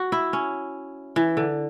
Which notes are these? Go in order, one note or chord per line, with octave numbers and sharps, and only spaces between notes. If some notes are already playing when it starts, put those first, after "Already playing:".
Already playing: F#4
E4
C#4
E3
D3